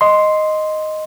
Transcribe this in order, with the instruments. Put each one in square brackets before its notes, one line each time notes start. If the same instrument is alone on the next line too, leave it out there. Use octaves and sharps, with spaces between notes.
[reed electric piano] D#5 C6